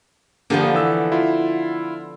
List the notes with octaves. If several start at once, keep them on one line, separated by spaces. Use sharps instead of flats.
D3 F3 A#3 B3 G4
E3 E6
E4 F4